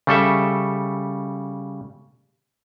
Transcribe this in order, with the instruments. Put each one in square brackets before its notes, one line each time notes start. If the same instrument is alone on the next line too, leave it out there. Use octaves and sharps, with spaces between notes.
[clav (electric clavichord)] C#3 G3 A4 E5